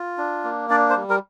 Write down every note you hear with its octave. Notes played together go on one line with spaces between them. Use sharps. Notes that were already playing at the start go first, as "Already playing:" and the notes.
Already playing: F4
D4
A#3
D4 D5
C5
G3
A#4